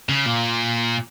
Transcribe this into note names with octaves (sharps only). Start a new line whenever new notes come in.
C#3
A#2